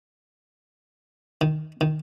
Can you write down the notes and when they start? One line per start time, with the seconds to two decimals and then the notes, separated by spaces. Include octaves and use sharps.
1.41 D#3
1.81 D#3